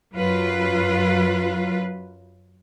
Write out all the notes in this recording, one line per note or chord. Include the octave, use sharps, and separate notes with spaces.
F#2 F#3 F4 B4